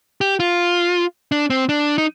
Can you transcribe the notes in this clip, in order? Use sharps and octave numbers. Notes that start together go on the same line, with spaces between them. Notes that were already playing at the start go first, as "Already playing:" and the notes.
G4
F4
D4
C4
D4
D#4